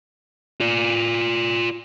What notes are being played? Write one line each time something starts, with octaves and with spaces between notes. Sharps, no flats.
F4 D5